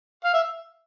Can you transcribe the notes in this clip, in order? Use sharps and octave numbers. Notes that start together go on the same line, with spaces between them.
F5
E5